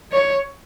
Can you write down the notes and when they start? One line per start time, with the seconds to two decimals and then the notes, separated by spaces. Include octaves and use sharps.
0.12 C#5